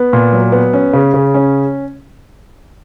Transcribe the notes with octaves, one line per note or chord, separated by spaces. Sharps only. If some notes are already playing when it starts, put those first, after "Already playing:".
Already playing: B3
A#2
F#3
B3
C#4
C#3
C#3
C#4